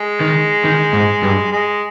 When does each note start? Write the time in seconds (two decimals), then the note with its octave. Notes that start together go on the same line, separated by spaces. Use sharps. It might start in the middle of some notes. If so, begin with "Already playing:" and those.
Already playing: G#3
0.20 D#3
0.64 D#3
0.93 G#2
1.23 G2
1.51 G#3